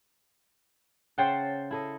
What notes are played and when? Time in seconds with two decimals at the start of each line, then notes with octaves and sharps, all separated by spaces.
1.18 C#3 C5 F#5 G5 A5
1.71 E4 A4 D#5